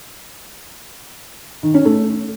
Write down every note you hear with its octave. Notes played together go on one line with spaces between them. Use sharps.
D#3
C#4
A3